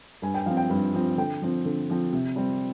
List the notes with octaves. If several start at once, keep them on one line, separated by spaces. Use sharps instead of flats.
G2 G#5
G5
F3 C4 F5
G5
G2
F3 C4
D3 G5
F3 C4
D3
F3 C4
C3
G3 C4